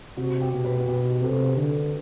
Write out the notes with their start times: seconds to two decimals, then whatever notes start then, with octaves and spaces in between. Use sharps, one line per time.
0.17 C3 F#4
0.42 G4
0.53 B2
0.65 B4
0.80 F#4
0.87 B2 G4
1.22 C3 A4
1.57 D3